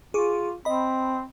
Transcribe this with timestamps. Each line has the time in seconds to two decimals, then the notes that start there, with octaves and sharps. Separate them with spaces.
0.14 F4 G#4 C#6 D6
0.65 C4 D#5 B5